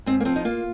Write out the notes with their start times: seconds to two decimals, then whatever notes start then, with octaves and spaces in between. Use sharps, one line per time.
0.06 G#2 C4
0.20 A#3
0.25 F3 C4
0.36 D#4
0.45 A#3 F4